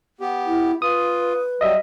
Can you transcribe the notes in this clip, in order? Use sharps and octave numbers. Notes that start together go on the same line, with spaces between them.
B3 G4
E4
F4 B4 D#6
F#3 G3 D#5 E5